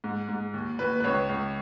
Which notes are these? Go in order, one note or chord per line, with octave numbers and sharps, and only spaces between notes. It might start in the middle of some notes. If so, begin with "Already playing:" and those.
G#2
G#2
D#2
D#2 B4
B4
C#2 C#5
C#2